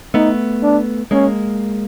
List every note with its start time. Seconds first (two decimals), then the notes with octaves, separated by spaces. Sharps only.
0.14 A3 B3 D#4
0.63 D4
1.11 G#3 A#3 C#4